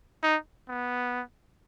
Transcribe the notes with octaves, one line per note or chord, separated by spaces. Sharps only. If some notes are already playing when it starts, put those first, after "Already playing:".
D#4
B3